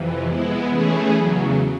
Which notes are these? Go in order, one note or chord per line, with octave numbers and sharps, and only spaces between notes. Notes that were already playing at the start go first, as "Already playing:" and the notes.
Already playing: F2 C3 E3
G#3 B3 E4
E3 A3 C#4 E4 G#4
E2 C#3 F#3